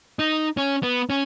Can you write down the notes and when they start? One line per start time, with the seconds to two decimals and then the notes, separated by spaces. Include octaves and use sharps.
0.19 D#4
0.57 C#4
0.83 B3
1.10 C#4